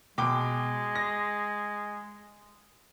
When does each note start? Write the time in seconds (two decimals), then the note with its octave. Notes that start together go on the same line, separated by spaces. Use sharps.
0.18 B2 G#3 G5 D6
0.95 A#6